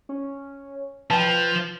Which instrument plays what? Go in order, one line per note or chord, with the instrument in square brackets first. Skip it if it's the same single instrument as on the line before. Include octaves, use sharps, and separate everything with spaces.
[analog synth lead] C#4
[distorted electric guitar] F3 [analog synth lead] B4 [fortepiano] G5 A5